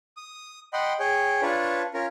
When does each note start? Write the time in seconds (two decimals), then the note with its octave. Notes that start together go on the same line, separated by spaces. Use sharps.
0.17 D#6
0.73 D#5 F#5 G5 B5 C6
0.99 G#4 C#5 G5
1.42 D4 F4 B4 C#5
1.94 C#4 F4 A#4